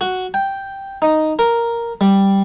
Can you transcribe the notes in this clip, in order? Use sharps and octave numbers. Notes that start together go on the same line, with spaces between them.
F#4
G5
D#4
A#4
G3